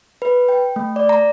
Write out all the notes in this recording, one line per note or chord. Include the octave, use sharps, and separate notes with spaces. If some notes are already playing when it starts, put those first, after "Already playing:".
B4
G5
A3
D5
A#5